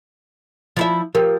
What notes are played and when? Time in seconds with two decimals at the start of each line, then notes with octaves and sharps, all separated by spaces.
0.77 F3 E4 E5
1.15 F3 G4 A#4